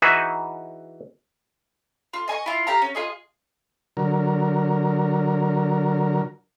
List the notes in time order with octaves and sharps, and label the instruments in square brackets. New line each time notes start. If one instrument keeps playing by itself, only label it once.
[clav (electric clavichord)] E3 D#4 F#4 G#4 B4 E5
[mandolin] F4
D#5 G#5 C6 C#6
E4 F4
G4 F5 A#5
C#4
F4 G#4 D#5
[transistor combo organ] D3 F#3 A#4